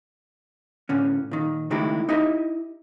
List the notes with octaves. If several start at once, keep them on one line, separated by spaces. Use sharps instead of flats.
A2 D3 C#4
A#2 D#3
C#2 D#3 A3 D#4 E4 G4
D#4 E4 G4 D#5 E5